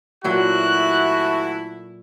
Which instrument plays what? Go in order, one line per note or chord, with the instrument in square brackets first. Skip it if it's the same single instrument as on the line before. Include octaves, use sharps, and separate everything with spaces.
[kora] A#2 F#3 [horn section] E3 A3 E4 [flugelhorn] F#4 [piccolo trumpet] F#6